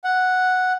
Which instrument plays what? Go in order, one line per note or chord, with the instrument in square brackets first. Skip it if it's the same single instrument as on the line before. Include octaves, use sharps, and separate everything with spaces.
[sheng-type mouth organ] F#5